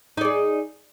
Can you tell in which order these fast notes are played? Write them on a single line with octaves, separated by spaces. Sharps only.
D#4 D5 G#4